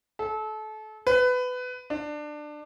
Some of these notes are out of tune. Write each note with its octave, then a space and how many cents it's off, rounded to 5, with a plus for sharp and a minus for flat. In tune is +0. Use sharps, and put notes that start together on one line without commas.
A4 -30
B4 +20
D4 +20